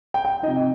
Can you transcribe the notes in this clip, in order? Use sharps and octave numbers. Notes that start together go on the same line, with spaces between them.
G5
G5
C3 F3 D#4 D#5